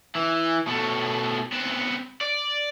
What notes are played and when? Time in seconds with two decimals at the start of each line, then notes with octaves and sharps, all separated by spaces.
0.15 E3
0.67 B2 A3
1.52 B3 C4
2.21 D5